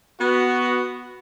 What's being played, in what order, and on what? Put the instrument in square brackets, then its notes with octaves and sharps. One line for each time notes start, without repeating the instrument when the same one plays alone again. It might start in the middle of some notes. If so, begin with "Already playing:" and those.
[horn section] B3 F#4